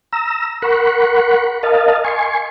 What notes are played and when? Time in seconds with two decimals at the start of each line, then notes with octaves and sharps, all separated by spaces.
0.13 A#5 E6
0.62 A#4 F#5 B5 C#6
1.63 A#4 D#5 F5 A5
2.05 G#5 C6 C#6